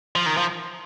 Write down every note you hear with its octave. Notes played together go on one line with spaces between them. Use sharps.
F3
D#3
F3